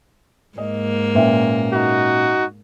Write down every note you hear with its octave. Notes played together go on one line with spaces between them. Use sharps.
G#2 A#3 D#5
A#2 C#4 B4 E5 G5
D#4 F#4